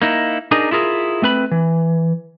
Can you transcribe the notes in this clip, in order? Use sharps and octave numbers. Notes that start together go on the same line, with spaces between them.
A#3 D#4 E4
D4 D#4 G#4 A#4
E4 F4 G#4 A#4
A3 C4 B4 B5
E3